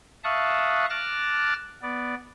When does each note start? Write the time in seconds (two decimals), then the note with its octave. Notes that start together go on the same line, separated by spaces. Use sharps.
0.24 E5 F5 A5 C#6 D#6 F#6
0.90 A5 D6 F6 F#6 A6 A#6
1.82 B3 D5